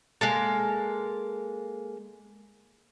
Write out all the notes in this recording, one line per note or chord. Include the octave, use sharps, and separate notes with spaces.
G#3 A#3 A4